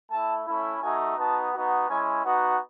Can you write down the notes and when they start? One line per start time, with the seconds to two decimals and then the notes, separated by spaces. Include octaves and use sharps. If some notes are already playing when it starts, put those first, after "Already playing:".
0.11 A3 E4 A5
0.47 A3 C#4 E4
0.82 A3 D#4 F#4 G#5
1.18 B3 D#4 F#4 A5
1.53 B3 D#4 F#4
1.88 G#3 C#4 E4 G#5
2.24 B3 D#4 F#4 F#5